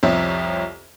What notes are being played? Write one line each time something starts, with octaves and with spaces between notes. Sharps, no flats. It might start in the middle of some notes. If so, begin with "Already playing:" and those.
C2 F2 F3 C#5 E5